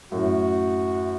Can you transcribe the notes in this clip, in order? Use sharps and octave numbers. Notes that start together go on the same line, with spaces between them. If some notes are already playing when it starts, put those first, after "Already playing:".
F#2 A2 F#4